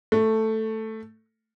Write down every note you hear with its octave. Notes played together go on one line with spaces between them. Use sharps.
A3